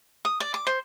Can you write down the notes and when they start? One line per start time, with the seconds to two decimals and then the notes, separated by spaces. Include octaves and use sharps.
0.25 D#6
0.40 D5
0.54 D6
0.67 C5